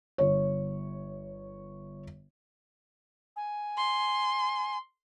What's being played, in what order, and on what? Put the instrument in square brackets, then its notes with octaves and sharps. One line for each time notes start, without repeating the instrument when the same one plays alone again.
[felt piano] G1 C#5
[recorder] G#5
[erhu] C6